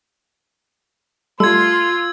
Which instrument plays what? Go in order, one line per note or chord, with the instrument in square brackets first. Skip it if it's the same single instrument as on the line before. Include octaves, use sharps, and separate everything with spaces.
[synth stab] G3 A3 A4 [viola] F4 [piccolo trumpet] C6 [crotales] E6 G#6